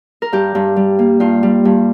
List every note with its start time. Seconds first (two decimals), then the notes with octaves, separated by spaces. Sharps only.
0.22 A#4
0.32 G2 G4
0.55 G2
0.76 G3
0.99 A#3
1.20 G2 F4
1.43 G3
1.65 G2